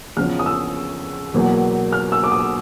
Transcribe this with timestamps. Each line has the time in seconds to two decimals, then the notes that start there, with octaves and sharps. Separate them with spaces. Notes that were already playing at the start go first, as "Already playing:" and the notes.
0.17 E2 C#3 F3 F6
0.39 D#6
0.46 E6
1.34 E2 B2 F#3 A#3
1.92 F6
2.12 E6
2.24 D6
2.32 D#6